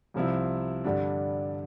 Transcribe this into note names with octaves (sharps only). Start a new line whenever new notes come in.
C2 C3 F3 C4 E4
G2 D3 G3 D4